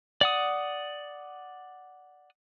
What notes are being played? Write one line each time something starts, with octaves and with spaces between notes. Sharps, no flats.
D5 F#5 D#6